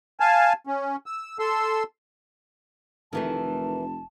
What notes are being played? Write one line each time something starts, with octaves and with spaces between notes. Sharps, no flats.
F5 G#5 A5
C#4
E6
A4 C6 E6
F1 D#3 E3 A3 A5